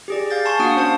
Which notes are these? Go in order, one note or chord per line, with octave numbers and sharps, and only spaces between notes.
G4 G#4 D5
F5 G6 A6
G#5 A5 C6 C#6
A#3 D4 F#4 F#5 D#6 D7
C#4 C5 F5 A5